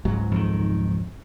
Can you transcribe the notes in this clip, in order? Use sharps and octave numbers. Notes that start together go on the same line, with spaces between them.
C#2 G#2 F#3
F2 D#3